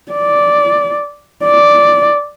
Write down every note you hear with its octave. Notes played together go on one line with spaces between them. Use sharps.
D5
D5